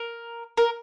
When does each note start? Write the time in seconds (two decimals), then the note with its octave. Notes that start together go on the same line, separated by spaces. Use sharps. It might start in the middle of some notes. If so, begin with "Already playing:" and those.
Already playing: A#4
0.57 A#4